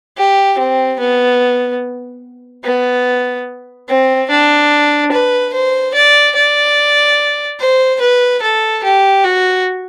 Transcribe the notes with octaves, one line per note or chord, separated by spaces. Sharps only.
G4
C4
B3
B3
C4
D4
B4
C5
D5
D5
C5
B4
A4
G4
F#4